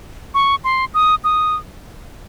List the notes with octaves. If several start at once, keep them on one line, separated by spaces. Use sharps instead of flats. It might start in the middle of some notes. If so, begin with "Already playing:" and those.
C#6
C6
D#6
D#6